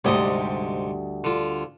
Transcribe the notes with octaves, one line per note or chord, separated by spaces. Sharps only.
D2 G#2 C3 G3 D#5
D3 F4